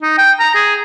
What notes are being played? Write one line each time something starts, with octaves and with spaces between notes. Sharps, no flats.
D#4
G5
A#5
G#4